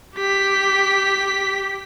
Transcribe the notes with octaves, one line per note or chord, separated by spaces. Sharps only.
G4 B6